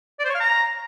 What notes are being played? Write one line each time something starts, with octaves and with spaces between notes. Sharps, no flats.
D5
C5
C#5
F5
A#5